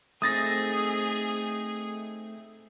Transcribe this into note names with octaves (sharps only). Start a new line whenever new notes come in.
A3 C4 D#4 G#4 D#6 A6 A#6